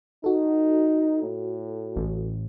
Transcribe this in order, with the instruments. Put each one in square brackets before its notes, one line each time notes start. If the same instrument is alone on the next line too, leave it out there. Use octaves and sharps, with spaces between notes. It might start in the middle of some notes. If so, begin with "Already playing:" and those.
[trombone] D#4 [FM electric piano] F#4 A4
[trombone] A2
[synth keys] A1